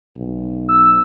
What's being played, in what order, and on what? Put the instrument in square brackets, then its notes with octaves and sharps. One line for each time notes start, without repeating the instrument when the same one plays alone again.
[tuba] B1
[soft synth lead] E6